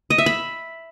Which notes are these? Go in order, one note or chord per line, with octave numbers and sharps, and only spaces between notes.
D#5
E5
B5